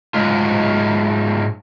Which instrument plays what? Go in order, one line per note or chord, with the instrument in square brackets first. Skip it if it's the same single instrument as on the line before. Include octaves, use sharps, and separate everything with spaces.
[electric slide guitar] G#2 F#3 G#3 F4